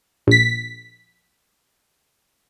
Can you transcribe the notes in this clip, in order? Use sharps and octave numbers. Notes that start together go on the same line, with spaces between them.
A#1 B6